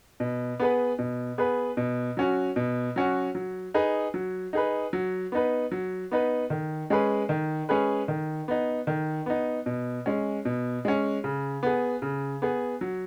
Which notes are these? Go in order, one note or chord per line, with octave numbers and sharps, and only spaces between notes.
B2
B3 G#4 B4
B2
B3 G#4 B4
B2
F#3 C#4 F#4
B2
F#3 C#4 F#4
F#3
D#4 G#4 B4
F#3
D#4 G#4 B4
F#3
B3 D#4 B4
F#3
B3 D#4 B4
D#3
G#3 C#4 G#4 B4
D#3
G#3 C#4 G#4 B4
D#3
B3 D#4
D#3
B3 D#4
B2
G#3 C#4
B2
G#3 C#4
C#3
B3 G#4
C#3
B3 G#4
F#3